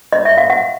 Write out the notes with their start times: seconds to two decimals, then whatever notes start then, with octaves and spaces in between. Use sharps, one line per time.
0.13 D#5
0.25 E5
0.38 F5
0.50 F#5